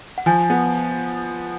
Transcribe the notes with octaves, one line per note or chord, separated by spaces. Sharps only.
F#5
F3 G#5
B3